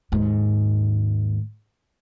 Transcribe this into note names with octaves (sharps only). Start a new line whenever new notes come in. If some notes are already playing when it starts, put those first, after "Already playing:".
D#2 G#2